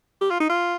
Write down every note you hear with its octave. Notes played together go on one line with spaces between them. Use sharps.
G4
F4
D#4
F4